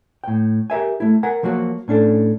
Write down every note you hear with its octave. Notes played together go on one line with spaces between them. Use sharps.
A2 G5
G4 A#4 E5 G#5
A3 E4
A#4 F#5 G#5
F3 F#3 A#3 F#4
A2 C#4 D4 A4